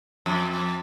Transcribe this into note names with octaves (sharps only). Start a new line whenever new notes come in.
F2